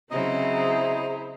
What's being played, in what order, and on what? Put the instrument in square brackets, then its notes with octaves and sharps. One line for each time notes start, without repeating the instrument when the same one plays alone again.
[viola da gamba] C#3 F#3 C4 [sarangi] E4 [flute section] G#4 C5 A#5 [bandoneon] D#5